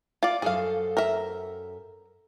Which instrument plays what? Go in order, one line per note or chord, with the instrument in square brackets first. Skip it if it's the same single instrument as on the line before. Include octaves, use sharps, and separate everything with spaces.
[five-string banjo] F4 D5
[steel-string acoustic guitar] F#2 A4 C5 [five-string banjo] G#4 F5
[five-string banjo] A#4 E5